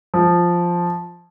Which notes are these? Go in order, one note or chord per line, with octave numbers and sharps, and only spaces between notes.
F3